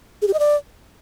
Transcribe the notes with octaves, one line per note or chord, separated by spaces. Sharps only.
G#4
G4
D#5
D5